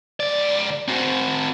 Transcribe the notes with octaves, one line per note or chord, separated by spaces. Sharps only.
C#2 D5
C4 F#4